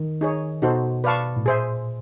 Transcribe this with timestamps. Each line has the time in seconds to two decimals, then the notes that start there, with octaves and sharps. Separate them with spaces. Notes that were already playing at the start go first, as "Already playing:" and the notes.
Already playing: D#3
0.21 D#4 G#4 C#5
0.62 B2 D#4 F#4 A4 C5
1.04 B4 D5 F5 A5 C#6
1.36 A2
1.45 A#2 G#4 C5 E5